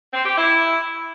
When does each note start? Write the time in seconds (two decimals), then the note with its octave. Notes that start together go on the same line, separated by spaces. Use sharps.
0.14 C4
0.26 G4
0.38 E4